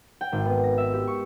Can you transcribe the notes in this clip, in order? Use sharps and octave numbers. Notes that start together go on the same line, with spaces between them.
G5
G#1
B3
A#6
E5
G4
C#6